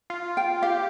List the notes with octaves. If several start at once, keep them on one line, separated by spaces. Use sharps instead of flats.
F4
G5
G4 F5